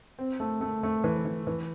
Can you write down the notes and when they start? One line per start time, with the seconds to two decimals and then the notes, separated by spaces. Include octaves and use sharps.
0.19 C4
0.40 A3
0.61 A3
0.83 A3
1.04 E3
1.25 E3
1.47 E3